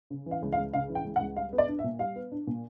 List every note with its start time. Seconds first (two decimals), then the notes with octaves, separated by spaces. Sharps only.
0.10 C#3
0.26 E3
0.31 F5
0.42 C#2
0.53 F5
0.58 C#2
0.73 C#3 F5
0.89 E3
0.95 G5
1.05 C#2
1.16 F#5
1.21 C#2
1.36 G3 F5
1.53 B3
1.58 D5
1.68 D4
1.79 E5
1.84 A#2
1.99 G3 F5
2.16 B3
2.32 D4
2.47 A#2